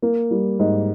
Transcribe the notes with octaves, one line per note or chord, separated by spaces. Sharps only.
A#3
G3
G#2